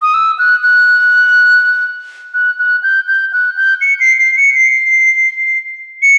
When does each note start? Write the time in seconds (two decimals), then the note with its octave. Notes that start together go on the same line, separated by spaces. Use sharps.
0.02 D#6
0.14 E6
0.39 F#6
0.63 F#6
2.34 F#6
2.59 F#6
2.83 G6
3.08 G6
3.33 F#6
3.57 G6
3.81 C#7
4.00 C7
4.18 C7
4.37 C#7
4.55 C7
6.02 C#7